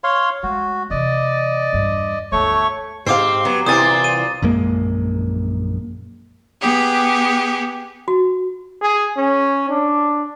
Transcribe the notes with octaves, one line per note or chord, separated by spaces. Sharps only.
C#5 F5 C6
G#3 A3 F#4
C3 E3 D5 D#5
E2 G2
G1 D2 A3 C#5 C#6
G#2 C4 G4 F5 D6 C7
F#3 B3
C2 A#2 E3 C4 G#5 D#6 A6
D#7
A#1 F#2 G#3 A#3
B3 G4 G#4
F#4
G#4
C#4
D4